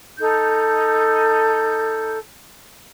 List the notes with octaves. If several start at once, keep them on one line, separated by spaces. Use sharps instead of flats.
D#4 A4 G6